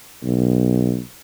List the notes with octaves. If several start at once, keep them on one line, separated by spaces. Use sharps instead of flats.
B1